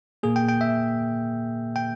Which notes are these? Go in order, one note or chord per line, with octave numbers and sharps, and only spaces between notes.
A#2 A#3 G#4
G5
G5
E5
G5